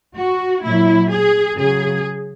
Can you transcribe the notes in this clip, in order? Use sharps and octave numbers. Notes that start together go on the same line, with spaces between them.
F#4
A#2 F#3 E4
G#4
C#3 F#3 G#4